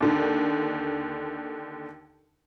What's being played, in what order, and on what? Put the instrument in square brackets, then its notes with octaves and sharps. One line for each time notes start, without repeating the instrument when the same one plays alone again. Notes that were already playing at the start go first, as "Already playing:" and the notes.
[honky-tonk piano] D#2 D3 D#3